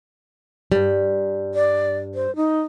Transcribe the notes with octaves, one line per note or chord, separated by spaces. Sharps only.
G2 G3
D5
C5
D#4